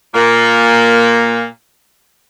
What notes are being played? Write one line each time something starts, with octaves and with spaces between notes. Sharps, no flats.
A#2 A#3